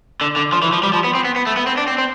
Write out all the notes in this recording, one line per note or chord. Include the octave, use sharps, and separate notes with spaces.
D3
D3
F3
E3
F3
G3
F3
B3
C4
B3
B3
A3
B3
C4
D4
C4
C4